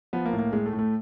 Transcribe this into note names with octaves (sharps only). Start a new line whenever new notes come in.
F3 B3
A#3
A2
A#3
A2 G#3
A3
A2
A3